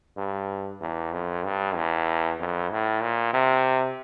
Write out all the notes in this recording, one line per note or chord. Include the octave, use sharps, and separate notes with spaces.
G2
E2
F2
G2
E2
F2
A2
A#2
C3